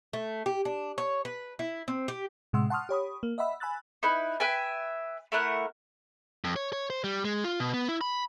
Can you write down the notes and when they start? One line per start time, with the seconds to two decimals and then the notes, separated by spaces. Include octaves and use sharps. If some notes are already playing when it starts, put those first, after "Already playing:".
0.13 A3
0.46 G4
0.65 D4
0.98 C#5
1.25 B4
1.59 E4
1.88 C4
2.08 G4
2.53 A2 C3 G#3 F#5 C6 E6
2.70 F#5 A5 C6 C#6 D#6 F6
2.89 G4 C#5 B5 D#6
3.23 A#3
3.38 D#5 E5 F#5 B5 E6
3.60 G#5 B5 E6 F#6 A6
4.03 D#4 E4 B4
4.40 B4 E5 G5 G#5
5.32 A3 E4 A#4 F#5
6.44 F2
6.56 C#5
6.73 C#5
6.90 C5
7.04 G3
7.25 G#3
7.44 F4
7.60 B2
7.74 B3
7.88 E4
8.01 B5